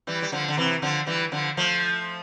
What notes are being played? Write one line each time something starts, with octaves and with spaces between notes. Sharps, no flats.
E3 G3
G3
D3 F3
D3
C3 E3
D3 F3
E3 G3
D3 F3
F3 A3